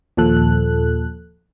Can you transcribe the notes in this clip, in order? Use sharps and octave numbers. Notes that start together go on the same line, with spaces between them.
D#2 A#2 F3 A4 F#6